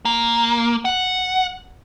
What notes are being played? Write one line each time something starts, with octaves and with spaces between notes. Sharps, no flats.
A#3
F#5